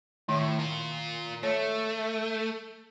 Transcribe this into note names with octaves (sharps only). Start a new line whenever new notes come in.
A2 D#3
F4 A#4
A3 C#5